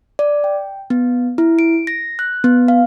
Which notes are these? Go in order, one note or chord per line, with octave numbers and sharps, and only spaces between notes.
D5
G5
B3
E4
D7
A#6
F#6
B3
F5